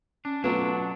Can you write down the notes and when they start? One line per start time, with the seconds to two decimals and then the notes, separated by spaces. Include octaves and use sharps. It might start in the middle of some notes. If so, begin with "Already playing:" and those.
0.25 C#4 D4
0.44 B2 F#3 A3 B3 D4 F4 B4